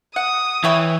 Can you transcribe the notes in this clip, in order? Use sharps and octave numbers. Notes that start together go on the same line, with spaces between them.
F#5 D#6
E3 E4 C#5 G5